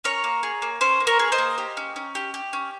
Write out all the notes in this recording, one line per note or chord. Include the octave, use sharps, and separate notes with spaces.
C#4 A#4 C#5
A#3
G#4
A#3
C#4 C5
A#3
A#4 C#5
G#4
C5 D#5
A#3
G4
C#4
C#4
G4
G4
C#4